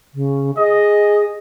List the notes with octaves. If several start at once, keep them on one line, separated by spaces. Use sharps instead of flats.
C#3
G#4 D#5